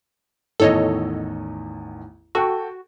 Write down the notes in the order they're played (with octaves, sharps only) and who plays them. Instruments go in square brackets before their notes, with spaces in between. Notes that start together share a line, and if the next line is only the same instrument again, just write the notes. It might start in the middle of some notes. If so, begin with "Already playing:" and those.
[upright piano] A1 E2 D#3 [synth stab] A4 C#5 D#5
[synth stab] F#4 [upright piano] A4 G5